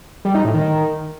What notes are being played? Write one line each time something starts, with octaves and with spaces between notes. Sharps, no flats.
G3
D#4
A2
D#3